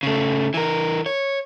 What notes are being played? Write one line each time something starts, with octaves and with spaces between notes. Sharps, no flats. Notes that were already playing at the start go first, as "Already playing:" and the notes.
C#3 A3
E3 A#4
C#5